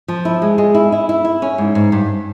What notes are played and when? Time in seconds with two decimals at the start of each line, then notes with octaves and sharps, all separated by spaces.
0.08 F3
0.25 E4
0.42 G#3
0.58 G#3
0.74 E4
0.92 E4
1.09 E4
1.25 E4
1.42 C#4
1.58 G#2
1.75 G#2
1.92 G2